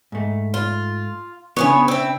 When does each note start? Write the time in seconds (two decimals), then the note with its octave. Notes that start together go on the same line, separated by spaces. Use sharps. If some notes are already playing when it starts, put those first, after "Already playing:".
0.12 G#2 A3
0.54 F4
1.57 C#3 B3 D4 E4 G#4 C#5
1.88 C4 E4